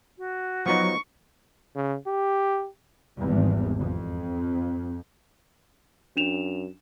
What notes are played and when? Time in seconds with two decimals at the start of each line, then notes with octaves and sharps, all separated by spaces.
0.18 F#4
0.66 F3 F#3 B3 D#4 C#6
1.75 C#3
2.07 G4
3.18 G#1 E2 G3
3.80 F2
6.17 F#2 D4 E7 F7